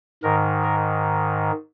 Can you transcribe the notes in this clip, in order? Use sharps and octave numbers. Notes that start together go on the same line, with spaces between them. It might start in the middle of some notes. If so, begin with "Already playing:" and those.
G#2 D#3 A#4
A#4